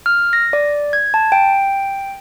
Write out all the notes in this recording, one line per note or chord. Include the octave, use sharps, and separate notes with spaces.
F6
A#6
D5
G#6
A5
G5